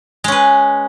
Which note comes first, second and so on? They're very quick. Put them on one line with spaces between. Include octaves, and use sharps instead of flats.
G#3 C#4 B4